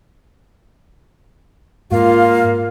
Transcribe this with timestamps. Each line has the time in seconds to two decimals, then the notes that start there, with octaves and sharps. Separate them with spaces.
1.91 G#2 A#3 F4 F5